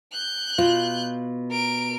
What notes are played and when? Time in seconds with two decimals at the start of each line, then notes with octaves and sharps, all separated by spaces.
0.13 F#6 G6
0.58 B2 F4
1.51 A#4 D7